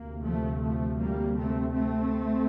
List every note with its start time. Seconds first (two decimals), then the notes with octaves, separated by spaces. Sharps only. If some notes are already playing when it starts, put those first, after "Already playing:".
Already playing: D2 C3 A#3
0.22 F3 A3
0.61 F3 A3
0.99 G3 A#3
1.36 A3 C4
1.74 A3 C4